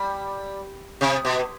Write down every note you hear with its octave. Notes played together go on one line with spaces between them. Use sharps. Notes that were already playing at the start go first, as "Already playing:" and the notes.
Already playing: G3
C3
B2